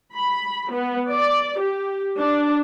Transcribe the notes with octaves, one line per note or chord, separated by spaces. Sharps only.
B5
B3
D5
G4
D4